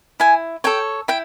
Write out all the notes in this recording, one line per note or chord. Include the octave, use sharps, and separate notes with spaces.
E4 G#5
A4 C#5 G5
E4 G5